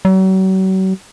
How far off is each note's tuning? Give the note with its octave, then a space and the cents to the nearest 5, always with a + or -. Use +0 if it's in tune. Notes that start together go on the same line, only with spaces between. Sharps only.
F#3 +40